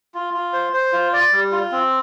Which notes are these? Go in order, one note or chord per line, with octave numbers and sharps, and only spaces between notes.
F4
F4
C5
C5
F4
D5
G3
F4
C4